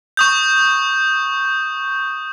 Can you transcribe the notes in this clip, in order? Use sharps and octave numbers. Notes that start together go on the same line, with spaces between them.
C#6 D#6 G6